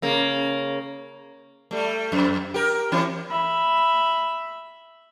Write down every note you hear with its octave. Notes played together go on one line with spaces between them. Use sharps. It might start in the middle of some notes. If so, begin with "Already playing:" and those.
C#3 A#3
G3 A3
F2
G4 A#4
E3 C4 E4
E5 B5